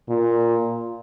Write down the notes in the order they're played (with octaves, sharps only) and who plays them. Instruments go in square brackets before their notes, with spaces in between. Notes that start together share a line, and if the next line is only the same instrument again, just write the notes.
[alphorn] A#2